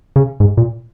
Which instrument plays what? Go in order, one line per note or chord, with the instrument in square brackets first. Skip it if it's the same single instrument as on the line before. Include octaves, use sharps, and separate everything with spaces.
[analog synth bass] C#3
G#2
A#2